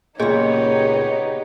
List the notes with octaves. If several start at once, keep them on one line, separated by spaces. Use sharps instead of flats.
C#2 A#2 B3 D#4 G4 G#4 C#5 D#5